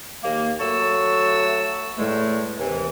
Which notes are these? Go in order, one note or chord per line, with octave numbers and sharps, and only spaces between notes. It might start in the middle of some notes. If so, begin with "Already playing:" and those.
D#2 A#3
F#3 A3 A5 C#6 E6
E2 A2 G#3 A3
D#2 C3 E3